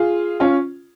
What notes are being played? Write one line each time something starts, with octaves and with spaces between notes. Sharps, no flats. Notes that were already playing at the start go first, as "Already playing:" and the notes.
Already playing: F4 G#4
C#4 F4